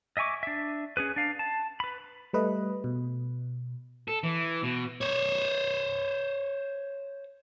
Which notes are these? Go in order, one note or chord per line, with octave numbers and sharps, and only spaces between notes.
D#5 E5 G#5 C#6 D6
D4 E5
C#4 G#4 B4
D4 F5
A5
B4 B5
G3 A3 B4 D#5
B2
A4
E3
B2
C5 C#5